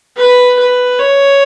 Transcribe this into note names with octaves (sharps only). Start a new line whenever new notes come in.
B4
B4
C#5